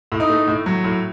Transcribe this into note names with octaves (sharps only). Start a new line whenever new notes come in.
A2
D#4
A3
A2
F#3
A2